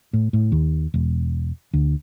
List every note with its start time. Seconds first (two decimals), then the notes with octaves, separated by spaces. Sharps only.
0.13 A2
0.33 A2
0.52 D#2
0.94 E1
1.73 D2